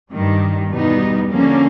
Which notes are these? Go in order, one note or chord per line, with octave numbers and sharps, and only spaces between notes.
G2 D#3 G3
E2 B2 G3 B3 D#4
D3 F3 A#3 C#4